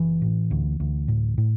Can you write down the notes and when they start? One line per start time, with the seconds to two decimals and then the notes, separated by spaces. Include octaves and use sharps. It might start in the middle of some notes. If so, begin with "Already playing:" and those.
Already playing: F#1 E3
0.22 A2
0.51 D2
0.80 D2
1.08 A2
1.38 A2